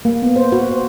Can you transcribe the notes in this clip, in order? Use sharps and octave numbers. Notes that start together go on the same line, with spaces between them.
A#3
B3
C5
F#4
C5